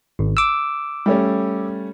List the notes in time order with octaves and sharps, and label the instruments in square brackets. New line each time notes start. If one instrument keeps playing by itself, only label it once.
[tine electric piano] G#1
D6 E6
[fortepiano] G3 A3 C#4